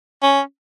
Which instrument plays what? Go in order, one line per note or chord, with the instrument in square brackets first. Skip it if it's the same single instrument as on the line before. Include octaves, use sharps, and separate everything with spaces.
[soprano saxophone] C#4